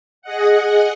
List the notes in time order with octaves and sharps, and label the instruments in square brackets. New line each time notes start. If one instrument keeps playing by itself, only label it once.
[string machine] G#4 D#5 F#5